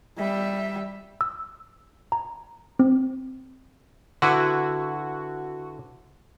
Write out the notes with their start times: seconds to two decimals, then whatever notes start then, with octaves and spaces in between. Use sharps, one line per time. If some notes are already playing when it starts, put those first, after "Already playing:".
0.17 G3 E5
1.21 E6
2.12 A#5
2.79 C4
4.22 D3 E4 F#4 B4